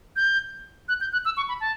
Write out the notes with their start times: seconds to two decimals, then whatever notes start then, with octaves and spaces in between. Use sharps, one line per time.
0.16 G6
0.89 F#6
1.01 G6
1.13 F#6
1.25 E6
1.37 C#6
1.48 B5
1.60 A5